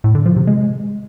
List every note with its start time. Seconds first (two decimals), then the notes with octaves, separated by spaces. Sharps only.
0.04 A2
0.15 D3
0.26 F3
0.36 C3
0.47 G#3